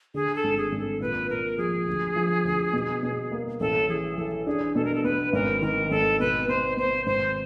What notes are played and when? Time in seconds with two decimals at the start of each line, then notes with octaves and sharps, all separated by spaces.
0.14 D3 G#4
0.36 A4
0.44 G#1
0.57 G#4
0.72 G#1
0.79 A4
1.00 A#2 B4
1.30 A#2 A#4
1.58 F3 G#4
1.87 D2
2.16 F3
2.45 D2
2.73 B2
3.03 B2
3.32 A#3
3.60 A1 A4
3.89 E3 G#4
4.17 E3 A4
4.46 D4 G#4
4.75 B2 A4
4.85 A#4
4.95 A4
5.04 B3 B4
5.33 G#1 A#4
5.61 D#3 A#4
5.91 G#1 A4
6.20 B2 B4
6.48 B3 C5
6.77 B3 C5
7.06 G#1 C5